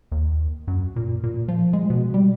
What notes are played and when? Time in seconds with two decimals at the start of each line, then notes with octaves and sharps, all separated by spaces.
0.12 D#2
0.68 F#2
0.96 A#2
1.24 A#2
1.48 F3
1.73 G#3
1.90 B2
2.14 G3